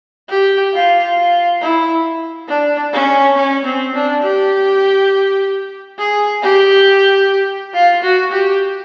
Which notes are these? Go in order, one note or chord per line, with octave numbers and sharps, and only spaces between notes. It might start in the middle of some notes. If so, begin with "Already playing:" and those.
G4
F4
F4
E4
D4
C#4
C#4
C4
D4
G4
G#4
G4
F4
F#4
G4